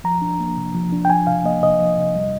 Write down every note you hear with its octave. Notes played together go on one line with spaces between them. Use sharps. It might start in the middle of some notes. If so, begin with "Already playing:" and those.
F3 A#5
D4
A#3
C3
F3
D4
G5
F3 G#5
C3 F5
A#3 D#5
C3 D#5
F3
C3
G3